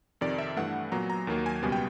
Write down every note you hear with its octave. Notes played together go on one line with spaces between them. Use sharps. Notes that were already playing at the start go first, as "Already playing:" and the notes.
F2 C3 D#3 D5
E5
G2 E3 A3 F#5
A#2 F#3 B3 A#5
A#5
D#2 D#3 F#3 A#3
G#5
C#2 B2 G3 B3 G#5
G5